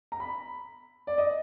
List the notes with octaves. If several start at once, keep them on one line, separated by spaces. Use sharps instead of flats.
A#5
B5
D5
D#5